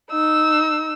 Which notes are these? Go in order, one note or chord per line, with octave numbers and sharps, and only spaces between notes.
D#4 E6